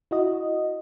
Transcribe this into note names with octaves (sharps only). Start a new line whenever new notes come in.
E4 F#4 D#5